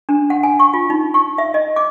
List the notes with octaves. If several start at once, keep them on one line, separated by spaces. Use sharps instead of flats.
D4
F#5
G#5
C#6
F4
D#4
C#6
E5
D#5
D6